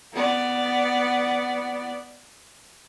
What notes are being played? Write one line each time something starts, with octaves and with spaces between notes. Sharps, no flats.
B3 D5